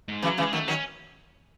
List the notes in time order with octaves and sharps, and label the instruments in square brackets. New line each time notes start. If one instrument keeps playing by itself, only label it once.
[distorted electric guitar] G#2
[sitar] C#3 E3 [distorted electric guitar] F#3
[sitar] C#3 E3 [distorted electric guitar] G#3
[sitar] D#3 F#3 [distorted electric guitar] A3
[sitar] D#3 F#3 [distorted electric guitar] C#4